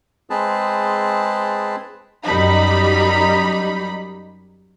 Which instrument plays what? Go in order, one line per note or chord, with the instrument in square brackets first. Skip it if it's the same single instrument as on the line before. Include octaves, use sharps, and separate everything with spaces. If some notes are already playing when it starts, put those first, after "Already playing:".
[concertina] G#3 C4 G#4 B4 A5
[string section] F#2 G3 D#4 B5